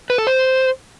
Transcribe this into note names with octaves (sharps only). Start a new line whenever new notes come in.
B4
A4
C5